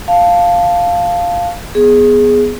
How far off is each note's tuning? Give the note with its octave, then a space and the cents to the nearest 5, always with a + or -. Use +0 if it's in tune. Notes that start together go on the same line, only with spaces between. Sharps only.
F5 +0 A5 +0
B3 +0 G#4 +0